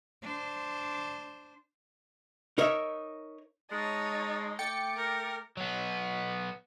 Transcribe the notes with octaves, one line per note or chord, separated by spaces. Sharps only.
D4 C5
D#4 A#4 C#5 D#5 E5
G#3 D#4 C#5 A5
A3 G5 D6 A6 C#7
A#4
F#3 B3